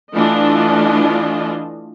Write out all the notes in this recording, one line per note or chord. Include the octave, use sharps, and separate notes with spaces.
E3 A3 D4 F4 D#5